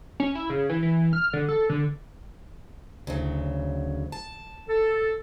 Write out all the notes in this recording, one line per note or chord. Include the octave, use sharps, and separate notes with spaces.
C#4
E4
C#3
E3
E3
F6
D3
A4
D3
D2 C#3 F#3
A5
A4